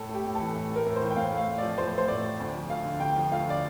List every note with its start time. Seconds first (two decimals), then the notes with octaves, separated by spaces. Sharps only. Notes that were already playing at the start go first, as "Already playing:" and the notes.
Already playing: A2 A4
0.09 A3
0.14 G4
0.25 A2
0.35 E3 A4
0.55 A2
0.71 A3 A#4
0.86 A2
0.96 C5
1.02 E3
1.11 G5
1.16 A2 F5
1.32 A3
1.37 F5
1.48 A2
1.58 F3 D5
1.78 A2 C5
1.93 A3
1.98 C5
2.08 A2 D5
2.24 F3
2.40 D2
2.54 F3
2.70 A3 F5
2.85 D3
3.00 D2 G5
3.16 F3
3.32 A3 F5
3.47 D3 D5